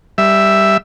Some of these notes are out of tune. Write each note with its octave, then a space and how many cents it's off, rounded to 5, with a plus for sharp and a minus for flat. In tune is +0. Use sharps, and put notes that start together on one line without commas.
G3 +0 E5 +0